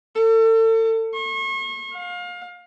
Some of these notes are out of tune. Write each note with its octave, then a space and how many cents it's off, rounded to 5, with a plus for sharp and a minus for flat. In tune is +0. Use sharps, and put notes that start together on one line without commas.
A4 +35
C#6 -40
F5 +30